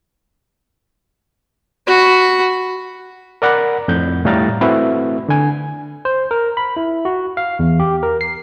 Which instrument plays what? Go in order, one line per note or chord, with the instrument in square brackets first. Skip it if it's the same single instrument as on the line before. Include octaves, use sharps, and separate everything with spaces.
[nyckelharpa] F#4 B5
[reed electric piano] A#4 D5 F#5 A#5 B5
F2 A2 G6
A2 G3 F5 A#5 A6
A3 C4 E4 F#4 B4
D3 G#5
[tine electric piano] C5
A#4
B5
E4
F#4
F5
E2
G4
A#4
C7